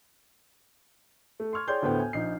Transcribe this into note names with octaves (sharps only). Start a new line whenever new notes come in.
A3
C6 C#6 F6 G#6
G#4 C#5 D5 G5 C6 G6
D2 A2 B3 C5 G5
G#5
A#1 D#4 C7